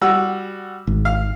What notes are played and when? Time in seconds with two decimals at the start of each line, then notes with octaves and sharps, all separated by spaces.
0.01 G3 F#4 E6
0.87 G#1
1.05 F5